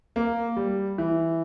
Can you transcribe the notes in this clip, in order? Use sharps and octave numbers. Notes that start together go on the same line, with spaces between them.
A#3
G3
E3